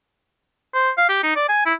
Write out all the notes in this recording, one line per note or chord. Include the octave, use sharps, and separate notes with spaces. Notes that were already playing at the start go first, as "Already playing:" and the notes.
C5
F5
G4
D#4
D5
G#5
E4